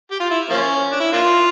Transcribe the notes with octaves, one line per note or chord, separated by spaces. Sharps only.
G4
F4
E4
F3 A#3 C#4
D4
E4
A#3 D4 F4